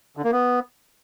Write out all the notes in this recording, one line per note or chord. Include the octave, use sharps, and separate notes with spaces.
D3
A#3
B3